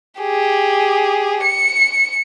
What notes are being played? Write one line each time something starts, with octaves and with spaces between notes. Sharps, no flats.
G4 G#4
C#7